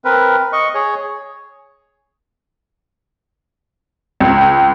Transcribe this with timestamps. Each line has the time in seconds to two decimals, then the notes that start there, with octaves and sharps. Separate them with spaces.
0.05 C4 A#4 B4
0.53 D#5 C#6
0.74 G#4 C#5
4.20 C#2